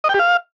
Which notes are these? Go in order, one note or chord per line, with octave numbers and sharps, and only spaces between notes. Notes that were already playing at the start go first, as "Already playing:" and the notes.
D#5
G5
G4
F5